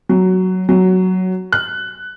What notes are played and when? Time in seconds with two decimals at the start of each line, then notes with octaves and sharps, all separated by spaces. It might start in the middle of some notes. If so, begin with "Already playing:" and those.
0.09 F#3
0.69 F#3
1.52 F#6